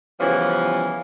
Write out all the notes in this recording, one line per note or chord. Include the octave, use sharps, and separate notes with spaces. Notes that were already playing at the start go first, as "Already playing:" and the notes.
C#3 E3 F3 G3 B3 C#4